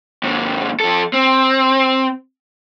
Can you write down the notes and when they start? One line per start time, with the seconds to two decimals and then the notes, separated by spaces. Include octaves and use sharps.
0.23 D#2 G#2
0.80 F3 A4
1.13 C4